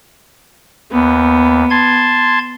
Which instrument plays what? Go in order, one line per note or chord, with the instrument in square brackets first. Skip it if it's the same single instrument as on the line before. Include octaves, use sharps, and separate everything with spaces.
[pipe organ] D#2 [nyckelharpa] B3
[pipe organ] A5 C6 G#6